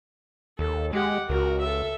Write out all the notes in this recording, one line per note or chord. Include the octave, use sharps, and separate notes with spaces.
D#2 A4
G#3 G4 F#5
C#2 F#4 A#4
A4 E5